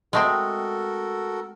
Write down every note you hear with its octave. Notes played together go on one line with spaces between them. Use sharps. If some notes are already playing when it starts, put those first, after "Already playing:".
G#3 A3 C4 F#4 A4 A#4